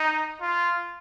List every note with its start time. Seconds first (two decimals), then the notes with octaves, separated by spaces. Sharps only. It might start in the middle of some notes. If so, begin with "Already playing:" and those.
Already playing: D#4
0.42 F4